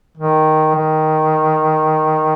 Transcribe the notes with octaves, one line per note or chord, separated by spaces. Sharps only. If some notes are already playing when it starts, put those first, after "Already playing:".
D#3
D#3